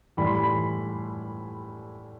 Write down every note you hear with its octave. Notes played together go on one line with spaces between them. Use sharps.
A2 E3 G3 B5
C6
B5